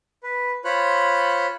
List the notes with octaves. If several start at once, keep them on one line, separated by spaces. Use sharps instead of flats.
B4
F4 C5 C#5 B5 F#6